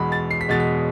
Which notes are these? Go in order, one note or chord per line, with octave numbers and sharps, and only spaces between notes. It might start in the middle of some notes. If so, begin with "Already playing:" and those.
Already playing: E2 B2 G#3 B5
A6
C7
B6
E2 B2 G#3 A6
B6